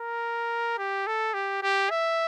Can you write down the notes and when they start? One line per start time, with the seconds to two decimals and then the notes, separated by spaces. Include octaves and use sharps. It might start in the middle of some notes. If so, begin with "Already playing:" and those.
Already playing: A#4
0.78 G4
1.07 A4
1.34 G4
1.63 G4
1.90 E5